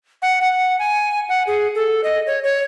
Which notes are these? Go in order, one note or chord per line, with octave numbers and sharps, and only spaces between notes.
F#5
F#5
G#5
F#5
G#4
A4
D#5
C#5
C#5